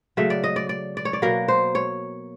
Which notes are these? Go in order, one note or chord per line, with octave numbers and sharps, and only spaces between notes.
C#3 F#3 A3 E5
D5
D#5
D5
D5
D5
C#5
D5
B2 F#3 A#3 A#4
C5
C#5